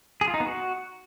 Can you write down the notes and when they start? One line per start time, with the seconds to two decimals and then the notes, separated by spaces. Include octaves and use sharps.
0.21 G#4
0.28 F4
0.34 D#4
0.40 B3
0.46 F#4